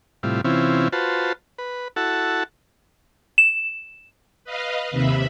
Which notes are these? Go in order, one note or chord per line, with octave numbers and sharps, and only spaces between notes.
A2 C3 G3 E4 F4
C3 E3 C4 C#4 E4 F4
F4 F#4 B4 C5 A5
B4
E4 F#4 A4 F#5 A5
E7
B4 D#5 F5
D#2 C3 E5 B5